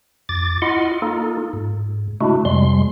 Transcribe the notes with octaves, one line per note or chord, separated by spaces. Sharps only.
F2 D6 A6
E4 F4 D#5 F#5 C6
A#3 D#4 F4 A4
G#2
C#3 G#3 A3 D4 E4 F#4
F2 C3 G3 G#3 C6